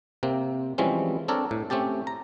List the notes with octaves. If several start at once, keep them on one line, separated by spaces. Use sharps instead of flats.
C3 A#3 C4
E3 F3 G3 G#3 C4 C#4
C4 D4 A4 A#4 C#5
A2
A3 C4 C#4 G4 A5
A#5